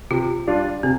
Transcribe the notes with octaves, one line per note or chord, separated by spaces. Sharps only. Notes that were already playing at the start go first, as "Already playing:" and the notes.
C3 F4
G3 D4 F4
C3 C4